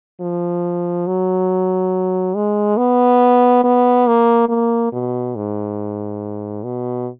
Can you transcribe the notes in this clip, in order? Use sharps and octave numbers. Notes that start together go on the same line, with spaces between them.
F3
F#3
G#3
B3
B3
A#3
A#3
B2
G#2
B2